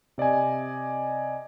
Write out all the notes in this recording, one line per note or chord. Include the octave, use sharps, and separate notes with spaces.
C3 D5 D#5 G#5